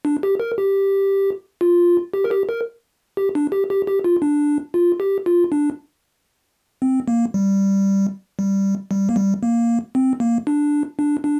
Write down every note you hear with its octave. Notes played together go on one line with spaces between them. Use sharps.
D4
G4
A#4
G4
F4
G4
A#4
G4
A#4
G4
D4
G4
G4
G4
F4
D4
F4
G4
F4
D4
C4
A#3
G3
G3
G3
A#3
G3
A#3
C4
A#3
D4
D4
D4